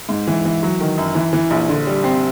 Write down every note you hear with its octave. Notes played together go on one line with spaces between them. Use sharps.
G#2
E3
E3
F#3
D#3
F#2
E3
E3
A#1
D3
G3
C4